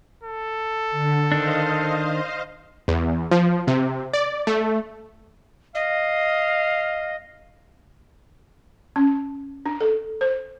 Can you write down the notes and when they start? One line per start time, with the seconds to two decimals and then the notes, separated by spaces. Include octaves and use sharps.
0.24 A4
0.91 D3
1.32 D#3 D4 C5 D#5 F5
2.88 E2
3.31 F3
3.67 C3
4.13 D5
4.47 A3
5.75 D#5 F5
8.96 C#4
9.66 D4
9.81 A4
10.21 C5